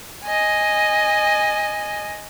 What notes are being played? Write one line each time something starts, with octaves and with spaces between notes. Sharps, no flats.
D#5 G#5